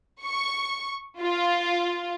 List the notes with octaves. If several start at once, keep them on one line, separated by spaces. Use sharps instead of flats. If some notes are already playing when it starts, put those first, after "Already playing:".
C#6
F4